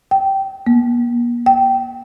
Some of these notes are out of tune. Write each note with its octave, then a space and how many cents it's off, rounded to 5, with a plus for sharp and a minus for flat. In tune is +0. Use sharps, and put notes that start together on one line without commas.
G5 -15
A#3 +40
G5 -15